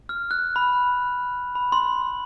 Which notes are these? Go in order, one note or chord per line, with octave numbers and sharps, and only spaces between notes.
F6
F#6
B5
B5
C6